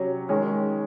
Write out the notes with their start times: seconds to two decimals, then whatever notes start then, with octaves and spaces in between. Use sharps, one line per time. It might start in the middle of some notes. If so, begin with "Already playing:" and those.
Already playing: C3 F#3 C#4
0.29 D#3 G#3 C#4